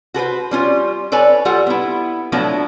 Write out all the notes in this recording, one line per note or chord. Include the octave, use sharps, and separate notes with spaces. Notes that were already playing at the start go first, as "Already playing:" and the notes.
F#4 A4 B4 C5
G3 C#4 F4
A4 B4 C#5 D5 G#5
G3 F4 A4 F#5
B3 E4
F3 F#3 A3 B3 D4 E4